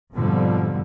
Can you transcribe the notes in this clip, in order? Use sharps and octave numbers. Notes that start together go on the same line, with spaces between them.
F2 G#2 B2 D3 F3 G3